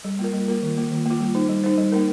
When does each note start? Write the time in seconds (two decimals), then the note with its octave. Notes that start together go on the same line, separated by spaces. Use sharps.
0.04 G3
0.19 A#3 F4 A#4
0.33 G3
0.48 A#3 F4 A#4
0.62 D#3
0.77 A#3 F4
0.91 D#3
1.06 A#3 F4
1.20 G3
1.35 D#4 C5
1.49 G3
1.63 D#4 C5
1.78 G3
1.92 A#3 D#4 A#4